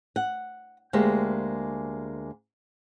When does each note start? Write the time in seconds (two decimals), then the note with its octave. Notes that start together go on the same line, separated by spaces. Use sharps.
0.16 F#5
0.93 D2 G#3 A#3 G4 C5